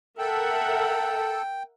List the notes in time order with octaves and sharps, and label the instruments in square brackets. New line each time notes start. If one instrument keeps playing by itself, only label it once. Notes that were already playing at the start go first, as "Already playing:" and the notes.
[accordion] A4 [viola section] A#4 E5 F#5 [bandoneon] G5